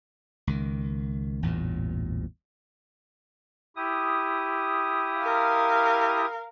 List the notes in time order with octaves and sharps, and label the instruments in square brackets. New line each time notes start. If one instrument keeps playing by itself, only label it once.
[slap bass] C#2 D#3
A1 E2 G2 A#2
[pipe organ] E4 G4 D#6
[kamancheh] A#4 F5